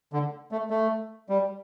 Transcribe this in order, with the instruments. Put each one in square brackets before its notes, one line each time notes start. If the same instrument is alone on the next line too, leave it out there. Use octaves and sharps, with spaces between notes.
[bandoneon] D3
A3
A3
G3